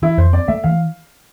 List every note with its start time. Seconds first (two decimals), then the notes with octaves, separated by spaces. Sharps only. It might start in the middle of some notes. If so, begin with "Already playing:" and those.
0.02 E3 E4
0.17 F2 C5
0.33 C4 D5
0.48 A3 E5
0.64 E3 F5